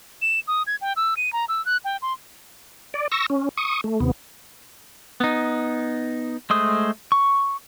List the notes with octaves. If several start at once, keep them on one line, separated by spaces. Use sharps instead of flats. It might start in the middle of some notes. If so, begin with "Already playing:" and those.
E7
D#6
G#6
G5
E6
D#7
A#5
E6
F#6
G5
C6
D5
C#6 E6 A#6
C#4
C#6 D#6
A3
D#2 C3 B3
B3 D#4
G#3 A3 C5 D#6
C#6